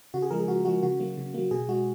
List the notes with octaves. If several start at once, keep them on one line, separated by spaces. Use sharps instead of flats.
C#3 F#4
G#4
F3 G#3 A#4
G#4
C#3 F#4
F3 G#3 F#4
C#3 F#4
F#3 A#3
C#3
F#3 A#3
B2 G#4
G#3 F#4